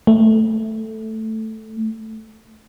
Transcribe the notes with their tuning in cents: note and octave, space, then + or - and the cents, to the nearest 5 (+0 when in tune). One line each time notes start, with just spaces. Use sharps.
A3 +0